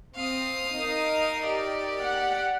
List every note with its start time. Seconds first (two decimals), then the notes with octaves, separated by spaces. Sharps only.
0.15 C4 F5 D#6
0.75 D#4 A#4
1.42 G4 D5
2.02 F#5